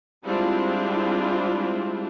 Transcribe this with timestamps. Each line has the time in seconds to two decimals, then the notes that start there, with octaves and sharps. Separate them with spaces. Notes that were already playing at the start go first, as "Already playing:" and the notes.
0.24 G3 G#3 C4 D4 E4 F4